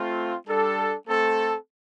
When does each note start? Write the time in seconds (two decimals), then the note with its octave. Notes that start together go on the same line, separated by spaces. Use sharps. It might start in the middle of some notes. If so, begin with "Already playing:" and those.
Already playing: A3 C4 F4
0.47 G3 D4 A4
1.07 A3 C4 A4